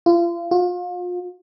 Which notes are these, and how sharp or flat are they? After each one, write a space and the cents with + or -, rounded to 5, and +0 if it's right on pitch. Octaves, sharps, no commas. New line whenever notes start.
F4 -35
F4 +35